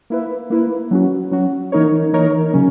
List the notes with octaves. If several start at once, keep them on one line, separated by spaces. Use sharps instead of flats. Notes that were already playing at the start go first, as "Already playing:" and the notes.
A#3 E4 B4
A#3 E4 B4
F#3 C#4 F#4
F#3 C#4 F#4
E3 A#3 D#4 A#4 C#5
E3 A#3 D#4 A#4 C#5
C#3 F#3 C#4